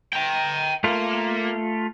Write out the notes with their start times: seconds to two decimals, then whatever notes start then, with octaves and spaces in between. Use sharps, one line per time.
0.13 G5 A#5
0.84 A3 A#3 F4